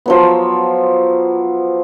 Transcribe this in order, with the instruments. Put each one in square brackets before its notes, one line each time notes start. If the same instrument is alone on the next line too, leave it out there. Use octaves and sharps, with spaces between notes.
[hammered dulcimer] F3 F#3 B3